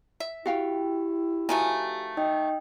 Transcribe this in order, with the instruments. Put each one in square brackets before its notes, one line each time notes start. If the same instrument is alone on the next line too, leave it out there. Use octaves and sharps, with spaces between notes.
[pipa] E5
[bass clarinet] E4 [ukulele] F#4 F5 G5 [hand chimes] G4
[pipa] D#3 F3 A3 [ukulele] F#4 G#5
[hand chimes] D#4 D#5 G5